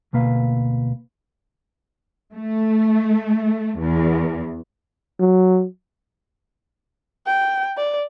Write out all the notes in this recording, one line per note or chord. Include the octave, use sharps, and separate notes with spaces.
D2 B2 A#3 B4 F5
A3
E2
F#3
G5
D5